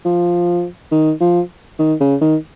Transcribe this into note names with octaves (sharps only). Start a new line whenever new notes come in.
F3
D#3
F3
D#3
C#3
D#3